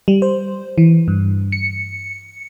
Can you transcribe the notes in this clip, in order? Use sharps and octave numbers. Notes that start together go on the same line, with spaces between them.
G3
C5
E3
G2
C#7